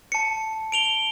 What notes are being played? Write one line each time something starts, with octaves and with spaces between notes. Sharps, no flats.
A5 C#7
D7 F7 G7